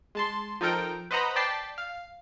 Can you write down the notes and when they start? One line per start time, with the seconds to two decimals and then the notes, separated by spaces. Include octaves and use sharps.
0.15 G#3 A5 C6
0.61 F3 D#4 A4 A#4 G5 D7
1.11 B4 C5 D#5 F#5 A#5 B5
1.36 D5 G5 A5 B6 C7
1.78 F5